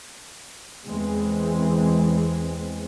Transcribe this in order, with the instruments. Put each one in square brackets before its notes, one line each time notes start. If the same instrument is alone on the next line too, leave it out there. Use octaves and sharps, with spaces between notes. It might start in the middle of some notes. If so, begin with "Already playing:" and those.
[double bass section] E2 E3 G#3 C4